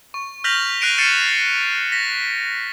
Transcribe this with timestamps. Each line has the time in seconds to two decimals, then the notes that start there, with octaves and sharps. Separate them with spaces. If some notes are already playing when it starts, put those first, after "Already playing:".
0.14 C#6
0.44 F6 G6 A#6 B6 F7 F#7
0.81 F#6 A#6 C7 D7 D#7 F7
0.98 F6 A6 C7 C#7 D#7 E7
1.29 B6
1.92 A#6 B6